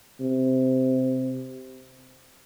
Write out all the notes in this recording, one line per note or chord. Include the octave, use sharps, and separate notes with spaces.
C3